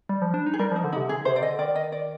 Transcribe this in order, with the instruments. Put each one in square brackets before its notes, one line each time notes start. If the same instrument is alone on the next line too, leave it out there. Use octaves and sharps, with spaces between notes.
[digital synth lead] G3
F3
D4
D#4
[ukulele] G#4
[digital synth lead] G3 [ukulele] A#4
[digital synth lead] F3 [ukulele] D#4
[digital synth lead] D3
[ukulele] D#4
[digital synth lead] C3
[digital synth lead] D3 [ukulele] G#4
[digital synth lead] C3 [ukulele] C5
[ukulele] D5
[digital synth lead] D3 [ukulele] D#5
[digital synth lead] D#3 [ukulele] D5
[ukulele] D#5
D5